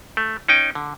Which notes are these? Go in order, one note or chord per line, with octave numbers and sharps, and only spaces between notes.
A3
C#4 D#4 G5
D3